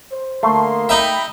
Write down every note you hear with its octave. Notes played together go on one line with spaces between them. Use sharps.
C5
D2 A3 A#3 C6
D#4 E5 G5 B5